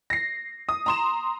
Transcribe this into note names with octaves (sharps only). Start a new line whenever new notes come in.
A#6 C7
D#6
A#5 C6 E7